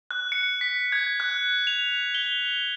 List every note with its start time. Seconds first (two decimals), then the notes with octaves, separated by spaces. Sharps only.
0.11 F#6
0.32 C#7
0.61 B6
0.92 G#6
1.20 F#6
1.67 F7
2.15 G7